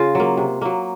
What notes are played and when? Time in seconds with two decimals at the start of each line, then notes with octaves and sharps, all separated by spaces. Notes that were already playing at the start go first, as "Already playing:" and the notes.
Already playing: C#3 F4
0.15 F#3 A#3
0.37 C3
0.62 F#3 A#3